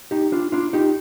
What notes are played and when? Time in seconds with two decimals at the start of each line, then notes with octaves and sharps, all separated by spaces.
0.11 D#4 G4
0.32 D4 F4
0.52 D4 F4
0.73 D#4 G4